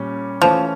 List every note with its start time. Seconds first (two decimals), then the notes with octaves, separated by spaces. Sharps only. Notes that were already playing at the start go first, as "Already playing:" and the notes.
Already playing: A#2 G3 C#4
0.42 E3 F3 A3 C#4